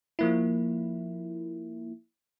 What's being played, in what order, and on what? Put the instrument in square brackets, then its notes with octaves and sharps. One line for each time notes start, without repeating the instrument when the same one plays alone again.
[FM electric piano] F3 A#3 E4